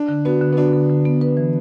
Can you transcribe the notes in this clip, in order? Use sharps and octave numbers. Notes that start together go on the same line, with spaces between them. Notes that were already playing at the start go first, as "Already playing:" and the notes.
Already playing: D4
D3
B3 F#4
D3
B3
D4 F#4
D3
D3
B3
B4
E3